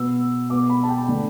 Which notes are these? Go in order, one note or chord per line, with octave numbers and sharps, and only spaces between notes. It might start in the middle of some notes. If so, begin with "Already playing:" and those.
Already playing: B2 B3 E6
B2 B3 D6
B5
A5
G5
D3 A3